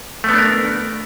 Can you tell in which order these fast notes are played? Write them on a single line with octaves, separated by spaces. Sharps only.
A3 B3 D4 A#4